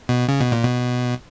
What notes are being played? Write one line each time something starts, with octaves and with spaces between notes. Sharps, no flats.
B2
C#3
B2
A#2
B2